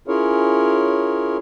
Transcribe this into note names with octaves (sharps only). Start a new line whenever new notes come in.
C#4 E4 F4 G#4 A#4 C#5